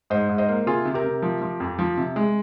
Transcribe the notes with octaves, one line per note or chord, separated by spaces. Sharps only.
G#2 C5 D#5
G#2
C5 D#5
A#3
C3 F4 G#4
C3
G4 A#4
C3
F3
F3
F2
F3
C3
G#3